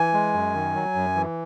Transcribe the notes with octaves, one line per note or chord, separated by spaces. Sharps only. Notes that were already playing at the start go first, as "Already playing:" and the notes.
Already playing: E3 G#5
G#3
F#2
D#3
F#3
F#2
E3